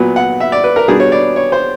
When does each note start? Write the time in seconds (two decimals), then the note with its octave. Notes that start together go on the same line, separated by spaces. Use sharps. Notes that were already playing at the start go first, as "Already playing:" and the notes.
Already playing: A#2 F#3 B3
0.16 F#5
0.40 E5
0.52 D5
0.64 B4
0.76 A#4
0.88 B2 G3 B3 D4 G#4
1.00 C#5
1.12 D5
1.36 C#5
1.52 C5